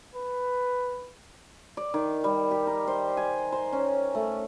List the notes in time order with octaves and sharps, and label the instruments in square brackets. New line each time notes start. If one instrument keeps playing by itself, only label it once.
[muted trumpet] B4
[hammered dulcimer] D5
D#3
G3
G4
A#4
C5
G#5
C5
C#4
A3